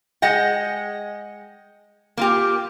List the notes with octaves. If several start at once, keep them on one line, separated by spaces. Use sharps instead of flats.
G#3 D#5 F#5 G5
A#3 F4 G4